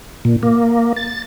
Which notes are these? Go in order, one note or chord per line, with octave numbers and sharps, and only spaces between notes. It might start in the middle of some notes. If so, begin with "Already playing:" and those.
A#2
A#3
A6